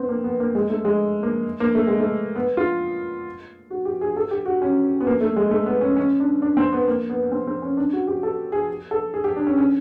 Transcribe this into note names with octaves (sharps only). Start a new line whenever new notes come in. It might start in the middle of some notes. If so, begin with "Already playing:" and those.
Already playing: B3 C4
A#3
B3
A#3
G#3
A3
G#3
A#3
A#3
A3
G#3
A3
B3
F4
F#4
G4
G#4
A4
G4
F#4
C#4
B3
A#3
A3
G#3
A3
B3
C#4
C#4
D4
D4
C4
B3
A#3
B3
B3
C4
C4
C#4
D4
F#4
G4
A4
G#4
A4
G#4
G4
D4
C#4
C#4